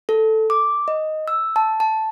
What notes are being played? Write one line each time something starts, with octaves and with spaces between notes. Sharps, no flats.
A4
D6
D#5
E6
A5
A5